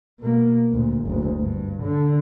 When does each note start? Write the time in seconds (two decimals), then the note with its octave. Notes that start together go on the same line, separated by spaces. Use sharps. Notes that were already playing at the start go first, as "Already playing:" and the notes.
0.20 B2 A#3
0.72 D2 A#2
1.04 F#1 D2
1.41 G2
1.83 D3